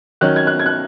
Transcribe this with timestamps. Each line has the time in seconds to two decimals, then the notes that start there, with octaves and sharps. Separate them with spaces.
0.21 D#3 F#3 C#4 F#6
0.36 G#6
0.47 F#6
0.59 G#6
0.66 F#6